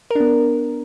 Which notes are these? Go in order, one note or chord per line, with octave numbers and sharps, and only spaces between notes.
B3 D4 A#4